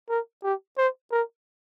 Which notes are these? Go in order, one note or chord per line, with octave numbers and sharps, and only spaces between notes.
A#4
G4
C5
A#4